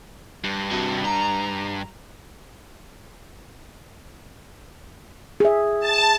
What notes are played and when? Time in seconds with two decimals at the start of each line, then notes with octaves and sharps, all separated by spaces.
0.44 G2
0.72 C3 F#4
1.05 A#5
5.40 G#4 E5
5.79 A5